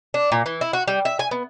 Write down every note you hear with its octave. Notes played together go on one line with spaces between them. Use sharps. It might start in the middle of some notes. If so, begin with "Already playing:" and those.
D4
A#2
E3
E4
F#4
G3
E5
G#5
B3